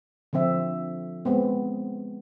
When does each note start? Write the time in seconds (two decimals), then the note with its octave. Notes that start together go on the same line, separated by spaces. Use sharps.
0.33 D3 F3 C4 E5
1.25 G#3 B3 C4